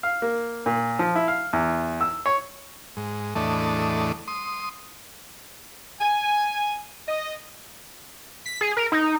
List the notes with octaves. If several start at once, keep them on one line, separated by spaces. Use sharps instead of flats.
F5
A#3
A#2
F3
E4
F5
E2
E6
C#5
G#2
E2 A2 A3 D4 D#5
C6 D#6
G#5
D#5
B6
G#4
A#4
D#4